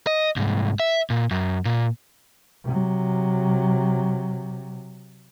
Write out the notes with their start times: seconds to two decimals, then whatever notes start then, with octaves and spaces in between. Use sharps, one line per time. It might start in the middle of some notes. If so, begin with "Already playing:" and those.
0.07 D#5
0.36 C2 G#2
0.80 E5
1.10 A#2
1.31 F#2
1.65 A#2
2.64 C3 F#3